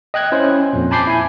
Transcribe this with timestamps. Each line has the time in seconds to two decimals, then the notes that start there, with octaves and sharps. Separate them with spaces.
0.14 D#5 G5 F#6 G#6
0.32 C#4 E4 C5
0.73 F2 A#2
0.91 G#5 A5 B5 D6 G6 C7
1.07 E4 G#5